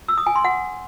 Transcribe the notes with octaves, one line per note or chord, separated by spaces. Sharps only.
E6
D#6
G#5
C6
F#5